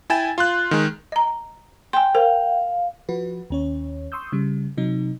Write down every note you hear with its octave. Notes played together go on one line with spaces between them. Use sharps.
E4 G5 G#5 A6 E7
F4 C6 F#6
D#3 G#3
D#5 A#5
G5 G#5 C6
A#4 C5 F5
F3 F#4 B4
D#2 C#4 C#5
C6 C#6 D#6 E6 G6
C#3 G3
C3 F#3 D#4